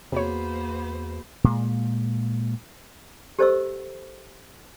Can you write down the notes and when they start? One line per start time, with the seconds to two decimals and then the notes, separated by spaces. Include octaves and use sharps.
0.12 E2 C3 A#3 B3 F#4 G#4 C5 C#5
1.44 A#2 G#3
3.39 G4 A4 C5 D#5 C#6 E6